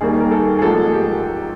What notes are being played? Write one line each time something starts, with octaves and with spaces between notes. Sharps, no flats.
D#2 D#3 G3 A#3 G#4
A#4
A4
G#4
A1 G#2 F3 A#3 A4
G4